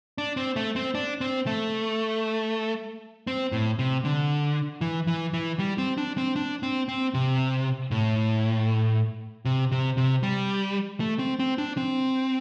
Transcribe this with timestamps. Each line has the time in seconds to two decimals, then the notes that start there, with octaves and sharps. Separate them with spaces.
0.18 D4
0.37 C4
0.56 A3
0.76 C4
0.95 D4
1.21 C4
1.47 A3
3.27 C4
3.52 A2
3.79 C3
4.05 D3
4.81 E3
5.07 E3
5.34 E3
5.59 G3
5.78 C4
5.98 D4
6.18 C4
6.36 D4
6.63 C4
6.89 C4
7.14 C3
7.91 A2
9.45 C3
9.71 C3
9.97 C3
10.23 G3
11.00 A3
11.19 C4
11.39 C4
11.58 D4
11.77 C4